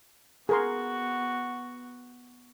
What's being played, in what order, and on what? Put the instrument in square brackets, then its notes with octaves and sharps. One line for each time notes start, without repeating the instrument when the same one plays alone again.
[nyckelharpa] B3 F#4 [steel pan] G#4 A#4 C6